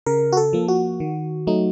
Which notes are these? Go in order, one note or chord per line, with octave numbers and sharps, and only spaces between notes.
C#3 A#4
F#4
A4
F3 A#3
F#4
D#3
F#3 A3 D#4